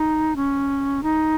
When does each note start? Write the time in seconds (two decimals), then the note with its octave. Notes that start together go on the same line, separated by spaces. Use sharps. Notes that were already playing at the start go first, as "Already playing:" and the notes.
Already playing: D#4
0.36 C#4
1.03 D#4